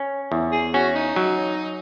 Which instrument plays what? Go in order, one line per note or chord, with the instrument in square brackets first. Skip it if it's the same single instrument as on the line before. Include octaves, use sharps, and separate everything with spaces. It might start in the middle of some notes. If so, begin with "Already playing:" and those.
Already playing: [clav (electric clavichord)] C#4
E2
[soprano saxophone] G#4
[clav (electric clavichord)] C#4 [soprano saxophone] F#4
[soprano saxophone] D#4
[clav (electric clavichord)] F#3